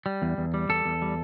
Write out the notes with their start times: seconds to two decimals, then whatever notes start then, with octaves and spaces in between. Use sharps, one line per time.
0.06 G3
0.22 E2
0.38 E2
0.54 G3
0.69 E2 A4
0.85 E2
1.02 G3